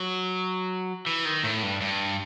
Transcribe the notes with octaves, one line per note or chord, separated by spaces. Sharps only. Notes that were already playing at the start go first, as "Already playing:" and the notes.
Already playing: F#3
E3
D#3
A2
G2
G2